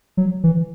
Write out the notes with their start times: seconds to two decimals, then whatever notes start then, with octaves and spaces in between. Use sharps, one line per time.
0.17 F#3
0.44 E3